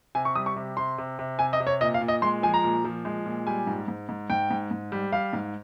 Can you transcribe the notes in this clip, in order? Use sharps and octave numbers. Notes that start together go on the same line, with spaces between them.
C3 G#5
C#6
G3 D#6
C#6
C3
C3 C6
C3
C3
C3 G#5
D#5
C3
C#5
A#2 D#5
F5
A#2
D#5
G#3 C6
F3 G#5
A#5
A#2
F3
G#3
A#2
G3 G#5
G#2
G#2
G#2
G#2 G5
G#2
G#2
G3
G3 F5
G#2